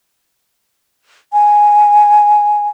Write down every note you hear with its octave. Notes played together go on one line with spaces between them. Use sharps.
G#5